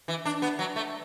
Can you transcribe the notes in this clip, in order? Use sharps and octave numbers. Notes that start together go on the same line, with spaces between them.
E3
D4
B3
F#3
A3